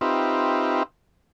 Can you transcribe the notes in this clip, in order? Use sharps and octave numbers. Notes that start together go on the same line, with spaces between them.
C4 D#4 F4 G4 B4 E5